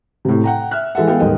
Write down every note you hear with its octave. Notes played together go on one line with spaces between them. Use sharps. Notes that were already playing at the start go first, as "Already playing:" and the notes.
A2 C3
F#5 G5 A#5
E5 F6 F#6
E3 G#3 A4 E5 F#5
G#3 B3 A4 F5 G5
D#1 G#2 A#4 D#5 G5